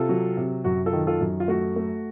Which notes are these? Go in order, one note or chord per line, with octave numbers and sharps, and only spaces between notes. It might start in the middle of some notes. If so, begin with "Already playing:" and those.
Already playing: C3 F4 A4
F#3
C3
F#2 F#4
F4 A4
D#3
F4 A4
F#2
F4
A3 F#4
A3